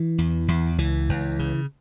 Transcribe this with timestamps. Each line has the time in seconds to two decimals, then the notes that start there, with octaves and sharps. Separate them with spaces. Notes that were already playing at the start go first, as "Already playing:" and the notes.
Already playing: E3
0.18 E2
0.48 E2
0.78 C#2 E3
1.09 C#2
1.39 C#3